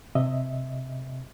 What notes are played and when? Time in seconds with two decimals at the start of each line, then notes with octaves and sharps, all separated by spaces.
0.15 C3 D#5 E5